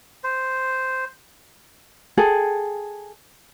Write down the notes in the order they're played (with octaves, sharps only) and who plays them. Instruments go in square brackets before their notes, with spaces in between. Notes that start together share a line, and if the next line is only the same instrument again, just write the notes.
[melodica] C5
[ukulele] G#4 A4 G5